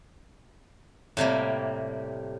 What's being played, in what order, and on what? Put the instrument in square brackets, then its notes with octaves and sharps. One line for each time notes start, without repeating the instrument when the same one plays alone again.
[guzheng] A2 C3 G3 A#3